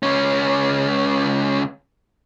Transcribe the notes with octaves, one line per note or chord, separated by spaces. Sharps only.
C#2 C#4